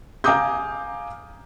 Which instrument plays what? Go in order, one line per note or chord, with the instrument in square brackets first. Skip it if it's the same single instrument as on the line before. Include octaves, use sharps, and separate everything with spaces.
[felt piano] F5 G#5 A#5 D6 D#6 G6